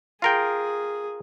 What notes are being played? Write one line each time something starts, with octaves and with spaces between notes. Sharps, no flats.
F4 G#4 A#4 G5